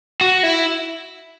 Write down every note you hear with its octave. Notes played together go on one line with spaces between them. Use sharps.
F#4
E4